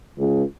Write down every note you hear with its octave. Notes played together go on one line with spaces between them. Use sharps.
C#2